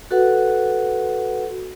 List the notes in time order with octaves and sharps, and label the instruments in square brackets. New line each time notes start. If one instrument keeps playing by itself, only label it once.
[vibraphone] F#4 A4 B4 F#5